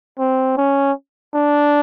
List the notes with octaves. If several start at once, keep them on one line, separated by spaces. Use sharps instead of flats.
C4
C#4
D4